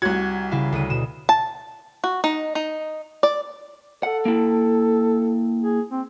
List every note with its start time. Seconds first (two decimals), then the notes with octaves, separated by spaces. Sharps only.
0.02 C2 F#4 G#6
0.51 C#3 E4 F5
0.72 D2 D#7
0.90 B2 E7
1.29 A5
2.04 F#4
2.24 D#4
2.55 D#4
3.23 D5
4.03 A4 F#5
4.25 A#3 E4
5.63 G#4
5.92 C4